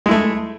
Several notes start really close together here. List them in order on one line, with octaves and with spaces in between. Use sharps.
G#3 E4 A3